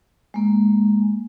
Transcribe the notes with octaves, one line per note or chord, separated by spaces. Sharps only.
G#3 A#3